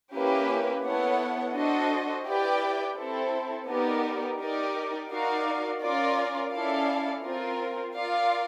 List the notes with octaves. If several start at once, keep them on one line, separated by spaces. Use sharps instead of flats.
A#3 C#4 E4 G4 B4
B3 E4 A4 C#5 F#5
D4 F#4 A4 C5 D#5
E4 G4 B4 D5 G5
C4 E4 A4
B3 D#4 G4 A#4 D5
D#4 G4 A#4 D5
D#4 F#4 A#4 D5 F5
C#4 F4 A#4 D5
C#4 E4 A4 D5 F5
C4 F4 A#4
F4 A#4 D5 F5